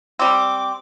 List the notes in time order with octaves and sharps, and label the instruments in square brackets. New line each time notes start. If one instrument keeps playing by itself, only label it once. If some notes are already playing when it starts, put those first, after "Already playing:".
[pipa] G3 C4 [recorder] D6